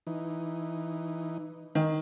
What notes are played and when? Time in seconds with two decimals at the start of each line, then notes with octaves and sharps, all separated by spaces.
0.07 E3 D#4
1.75 D#3